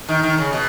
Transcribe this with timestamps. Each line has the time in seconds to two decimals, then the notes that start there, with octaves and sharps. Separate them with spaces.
0.09 D#3
0.23 D#3
0.38 C#3
0.53 B2